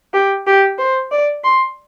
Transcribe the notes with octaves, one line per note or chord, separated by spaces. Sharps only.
G4
G4
C5
D5
C6